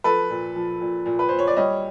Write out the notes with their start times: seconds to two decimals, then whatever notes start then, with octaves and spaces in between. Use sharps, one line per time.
0.04 F3 A4 B4
0.30 A#2
0.55 F3
0.81 A#2
1.06 A#2
1.19 B4
1.29 A#2 C5
1.39 C#5
1.47 D5
1.57 G3 C#5 D#5